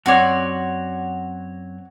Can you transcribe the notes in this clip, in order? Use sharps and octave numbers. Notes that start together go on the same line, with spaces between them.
F#2 C4 F#4 C#5 D5